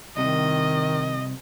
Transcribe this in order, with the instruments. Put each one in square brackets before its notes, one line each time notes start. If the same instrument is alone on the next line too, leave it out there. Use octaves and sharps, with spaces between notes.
[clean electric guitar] C2 C3 [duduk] D#3 [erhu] D#5